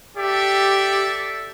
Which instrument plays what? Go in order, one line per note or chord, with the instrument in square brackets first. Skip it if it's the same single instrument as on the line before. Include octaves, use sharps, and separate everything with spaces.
[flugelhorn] G4 [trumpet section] A4 D5 E5